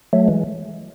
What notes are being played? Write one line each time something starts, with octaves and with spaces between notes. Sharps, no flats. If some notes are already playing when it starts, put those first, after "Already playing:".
F#3 A3
E3 G#3